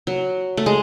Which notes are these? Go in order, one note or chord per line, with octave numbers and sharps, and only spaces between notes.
F#3
A3
G#3